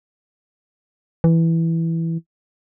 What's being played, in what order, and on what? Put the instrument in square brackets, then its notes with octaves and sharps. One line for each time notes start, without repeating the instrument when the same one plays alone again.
[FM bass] E3